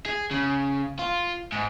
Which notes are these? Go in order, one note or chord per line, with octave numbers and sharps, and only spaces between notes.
G#4
C#3
F4
G#2